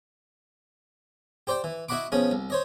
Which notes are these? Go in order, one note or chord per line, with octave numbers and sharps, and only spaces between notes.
G4 C5 D5 G5
E3
E4 F#4 D#5 F#5 B5 D6
B2 F3 C#4 G#4
C2
C5 C#5 D#5